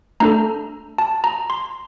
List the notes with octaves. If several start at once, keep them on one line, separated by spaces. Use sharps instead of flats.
A3 D4 A4 A#5
A5
A#5
C6